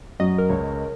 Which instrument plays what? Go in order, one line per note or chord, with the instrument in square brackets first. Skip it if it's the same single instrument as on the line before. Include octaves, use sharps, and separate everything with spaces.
[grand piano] F#2 F#3 [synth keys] D#5
[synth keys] A#4
[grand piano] C#2 [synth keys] C#5